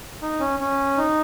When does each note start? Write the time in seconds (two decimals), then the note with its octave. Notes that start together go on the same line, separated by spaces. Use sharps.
0.22 D#4
0.40 C#4
0.59 C#4
0.97 D#4